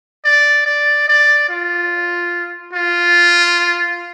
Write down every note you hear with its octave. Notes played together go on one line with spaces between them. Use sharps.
D5
D5
D5
F4
F4